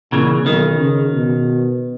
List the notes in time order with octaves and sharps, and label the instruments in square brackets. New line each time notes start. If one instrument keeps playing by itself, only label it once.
[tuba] A#2 [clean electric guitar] C#3 E3
[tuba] B1 [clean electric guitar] D#3
[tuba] C#3
B2